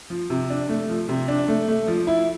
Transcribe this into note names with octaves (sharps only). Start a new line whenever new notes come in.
F3
C3
D4
A3
F3
C3
D4
A3
A3
F3
E4